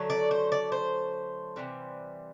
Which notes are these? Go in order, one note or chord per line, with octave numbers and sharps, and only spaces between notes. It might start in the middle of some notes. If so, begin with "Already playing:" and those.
Already playing: D3 F#3 A3
D5
C5
D5
C5
C3 E3 G3